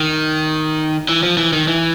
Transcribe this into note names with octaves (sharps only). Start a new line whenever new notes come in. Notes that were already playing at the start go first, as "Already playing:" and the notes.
Already playing: D#3
E3
F3
E3
D#3
E3